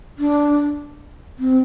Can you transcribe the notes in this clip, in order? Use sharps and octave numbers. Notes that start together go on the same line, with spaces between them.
D4
C4